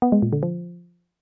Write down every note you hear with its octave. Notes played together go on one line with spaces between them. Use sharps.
B3
G#3
A#2
D3
F3